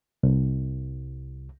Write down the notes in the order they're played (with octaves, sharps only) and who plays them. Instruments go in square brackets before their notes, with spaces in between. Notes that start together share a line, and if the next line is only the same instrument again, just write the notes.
[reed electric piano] C2